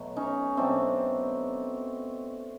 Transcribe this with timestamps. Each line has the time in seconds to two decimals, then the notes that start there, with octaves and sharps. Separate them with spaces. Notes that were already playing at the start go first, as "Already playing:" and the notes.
Already playing: B2 F#3 A3
0.16 C#4 D#4
0.57 B2 F#3 A3 C4 D4